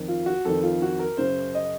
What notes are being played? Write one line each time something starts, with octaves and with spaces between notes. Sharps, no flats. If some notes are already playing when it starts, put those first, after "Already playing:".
Already playing: F2 D#3
F4
F#4
F2 D#3 A4
F4
F#4
A#4
F#2 C#3 C5
D#5